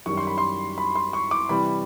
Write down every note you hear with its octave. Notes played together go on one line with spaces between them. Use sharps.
F#2 D#3 G3 C#6
C6
B5
C6
B5
C6
C#6
D6
C3 E3 G3 B5